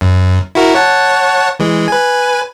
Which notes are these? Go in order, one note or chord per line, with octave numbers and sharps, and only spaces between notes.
F#2
E4 F#4 A#4
C#5 F#5 A5
E3 G#3
B4 G#5